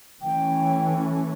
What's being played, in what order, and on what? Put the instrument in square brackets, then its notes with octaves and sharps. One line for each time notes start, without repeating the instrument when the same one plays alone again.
[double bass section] E3 A3 C#4 [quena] G5